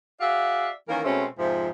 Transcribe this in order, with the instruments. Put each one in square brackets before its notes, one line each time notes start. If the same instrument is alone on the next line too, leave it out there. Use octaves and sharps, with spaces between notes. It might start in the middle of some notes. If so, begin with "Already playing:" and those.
[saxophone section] F#4 G#4 D5 E5 F5
D#3 E3 A#3 C#4 A#4
B2 G#3 A3 C4 C#4 C5
F2 G#2 C3 F3